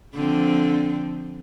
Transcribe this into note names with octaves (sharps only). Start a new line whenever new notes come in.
D3 F3 C4